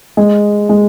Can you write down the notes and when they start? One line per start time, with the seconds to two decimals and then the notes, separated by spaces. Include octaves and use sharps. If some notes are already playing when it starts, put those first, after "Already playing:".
0.17 G#3
0.69 G#3